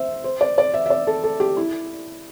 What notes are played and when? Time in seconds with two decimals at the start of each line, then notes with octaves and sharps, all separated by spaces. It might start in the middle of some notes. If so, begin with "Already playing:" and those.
Already playing: C5 E5
0.24 C5
0.41 D5
0.58 D5
0.74 E5
0.86 E5
0.90 D5
1.07 A4
1.24 A4
1.40 G4
1.57 E4